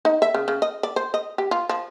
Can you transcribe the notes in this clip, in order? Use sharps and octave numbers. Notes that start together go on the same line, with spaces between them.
D#4
E5
C#3
C#3
D#5
D5
C5
D#5
G4
F4
F3